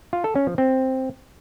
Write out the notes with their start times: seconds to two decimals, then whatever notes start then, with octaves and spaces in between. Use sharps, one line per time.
0.13 F4
0.24 A4
0.36 C#4
0.47 F3
0.58 C4